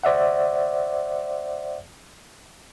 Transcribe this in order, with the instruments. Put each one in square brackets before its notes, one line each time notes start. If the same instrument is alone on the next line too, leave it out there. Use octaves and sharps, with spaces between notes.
[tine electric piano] C5 D5 E5 F#5